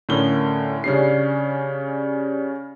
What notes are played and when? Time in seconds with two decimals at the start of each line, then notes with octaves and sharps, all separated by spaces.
0.09 A2 D3 C#4 A#4 G7
0.84 C#3 G3 C#4 D4 C7